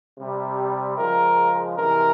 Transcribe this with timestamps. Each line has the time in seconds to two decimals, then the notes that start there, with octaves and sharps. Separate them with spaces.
0.18 C3 G3
0.97 C#3 F3 G#3 A#4
1.76 C3 E3 G#3 A#4